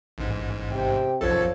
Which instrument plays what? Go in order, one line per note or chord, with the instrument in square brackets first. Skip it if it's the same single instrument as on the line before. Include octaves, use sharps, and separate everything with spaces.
[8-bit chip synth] A1 G#2
[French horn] C3 [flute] G5
[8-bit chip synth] B1 F#2 A4 [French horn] F3 [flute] C#5